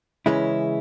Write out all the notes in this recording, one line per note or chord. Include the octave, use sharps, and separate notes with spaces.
C#3 E3 G#3 C#4 E4